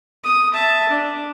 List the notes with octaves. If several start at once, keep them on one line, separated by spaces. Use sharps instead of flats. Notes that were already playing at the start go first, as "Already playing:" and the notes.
D#6
E5 A5
D4